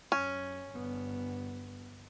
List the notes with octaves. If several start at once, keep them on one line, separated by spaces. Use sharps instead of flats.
F#2 C#4
G1 B3